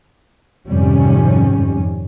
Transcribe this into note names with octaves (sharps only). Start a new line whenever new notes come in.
F2 G#2 C3 D#3 G3 C#4